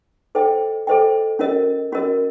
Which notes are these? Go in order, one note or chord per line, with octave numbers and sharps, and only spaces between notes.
A4 C5 D#5 G5
A4 C5 D#5 G5
C#4 F#4 A#4 D#5
C#4 F#4 A#4 D#5